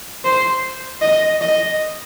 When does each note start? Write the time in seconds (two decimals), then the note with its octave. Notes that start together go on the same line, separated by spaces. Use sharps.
0.25 C5
1.02 D#5
1.41 D#5